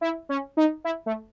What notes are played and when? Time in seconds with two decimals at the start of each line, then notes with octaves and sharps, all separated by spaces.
0.01 E4
0.29 C#4
0.57 D#4
0.84 E4
1.06 A3